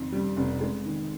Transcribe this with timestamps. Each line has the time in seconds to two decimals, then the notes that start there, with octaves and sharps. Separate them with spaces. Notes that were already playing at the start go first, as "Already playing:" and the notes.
Already playing: F2 D#3
0.12 G3
0.37 F1
0.61 G#3
0.85 D#3